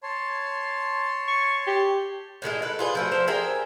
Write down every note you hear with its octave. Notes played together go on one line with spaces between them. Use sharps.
C#5 A5 C6
C#6
G4
A2 D#3 G#3 E4
A4 B4
F4 G#4 B4
F3 A3 F#4
F3 C5 A5 A#5
G#4 A#4 E5 G5